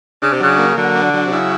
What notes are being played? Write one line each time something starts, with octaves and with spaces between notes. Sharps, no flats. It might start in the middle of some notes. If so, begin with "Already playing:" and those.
C#3 D4
C3
C#3 F#3
A#3
D3 F#3
D4
F#3
C3
C#3 E4